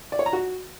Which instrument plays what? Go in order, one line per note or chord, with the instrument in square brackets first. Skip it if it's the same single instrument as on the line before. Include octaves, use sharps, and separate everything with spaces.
[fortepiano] D5
C#5
A#5
F#4